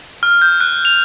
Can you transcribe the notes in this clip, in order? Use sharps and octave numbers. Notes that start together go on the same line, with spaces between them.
F6
G6
F#6
F7